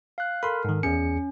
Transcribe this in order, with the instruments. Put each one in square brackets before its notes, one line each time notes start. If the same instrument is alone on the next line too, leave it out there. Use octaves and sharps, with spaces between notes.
[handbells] F5 F#6
[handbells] A4 A#4 [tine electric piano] B5 C6
[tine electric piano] G#2 D#3
[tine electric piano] E2 G#4 C#7 [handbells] C#4